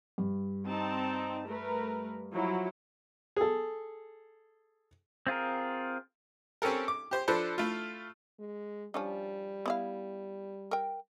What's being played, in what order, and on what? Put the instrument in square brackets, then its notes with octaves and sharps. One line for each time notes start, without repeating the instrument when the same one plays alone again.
[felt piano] G2
[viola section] C4 D#4 A5
A3 A#4 B4
F3 F#3 E4
[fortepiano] G#4 A4
[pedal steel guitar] C4 F4 G#4 A#4
[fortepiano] C4 C#4 G4 A4 A#4
D6
G4 C5 C6
F3 D4 A4 B4 C5
A3 E4 F4
[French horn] G#3
[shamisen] F3 C#4 D4 [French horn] G3
[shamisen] B3 E4 F5
A#4 G5